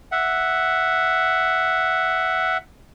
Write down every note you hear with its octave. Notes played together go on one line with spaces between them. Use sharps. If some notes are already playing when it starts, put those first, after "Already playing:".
E5 F#5